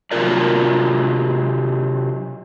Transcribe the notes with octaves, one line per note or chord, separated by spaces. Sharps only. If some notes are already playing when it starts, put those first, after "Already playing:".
C3 F#3 D4 F4 A#4 D5